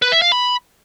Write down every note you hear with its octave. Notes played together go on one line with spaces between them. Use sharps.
B4
E5
F5
B5